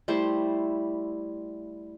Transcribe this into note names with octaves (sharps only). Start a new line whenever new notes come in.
G3 A3 E4 C5